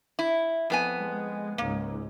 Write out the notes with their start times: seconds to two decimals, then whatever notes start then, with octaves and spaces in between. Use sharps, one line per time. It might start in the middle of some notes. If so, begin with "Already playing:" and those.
0.19 E4
0.70 F2 B3 G#5
1.00 G#3
1.58 C#2 G#2 A#3